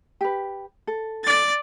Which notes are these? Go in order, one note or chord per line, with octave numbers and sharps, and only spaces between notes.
G4 B4
A4
D5 A6